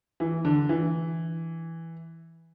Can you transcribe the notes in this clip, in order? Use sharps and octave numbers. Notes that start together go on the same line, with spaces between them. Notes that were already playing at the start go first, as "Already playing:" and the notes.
E3
D3
E3